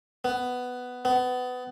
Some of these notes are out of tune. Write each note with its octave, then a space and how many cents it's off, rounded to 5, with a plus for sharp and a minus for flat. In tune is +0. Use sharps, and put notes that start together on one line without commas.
B3 +10
B3 +25